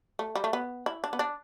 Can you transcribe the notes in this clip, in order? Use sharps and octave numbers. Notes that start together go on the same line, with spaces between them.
A3
G3
A3
B3
E4
D4
B3
D4